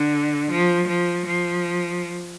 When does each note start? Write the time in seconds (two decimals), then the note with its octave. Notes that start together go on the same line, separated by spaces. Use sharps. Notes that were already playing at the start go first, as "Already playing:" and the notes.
Already playing: D3
0.51 F3
0.88 F3
1.26 F3